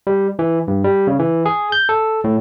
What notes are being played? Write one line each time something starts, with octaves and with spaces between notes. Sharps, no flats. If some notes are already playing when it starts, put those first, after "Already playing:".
G3
E3
G2
G3
C#3
E3
G#4
G6
A4
A2